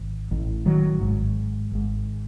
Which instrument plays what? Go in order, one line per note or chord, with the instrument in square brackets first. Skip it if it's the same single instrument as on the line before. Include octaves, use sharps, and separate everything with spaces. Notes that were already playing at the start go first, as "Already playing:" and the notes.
Already playing: [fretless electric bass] G#1
A1 A2
D#3 F#3
G#1 G#2
G#1 G#2